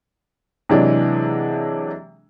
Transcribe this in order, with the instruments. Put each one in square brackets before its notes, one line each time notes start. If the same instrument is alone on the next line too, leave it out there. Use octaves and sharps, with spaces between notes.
[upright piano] C3 E3 F#3 G#3 D4